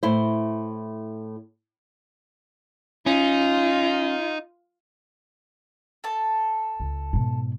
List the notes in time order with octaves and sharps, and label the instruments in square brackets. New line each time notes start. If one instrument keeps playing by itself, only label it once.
[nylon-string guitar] A2 E4 C5
[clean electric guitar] C#4 [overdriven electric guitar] D#4 [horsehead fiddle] F4
[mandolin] A4 A5
[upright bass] C#2
G#2 B2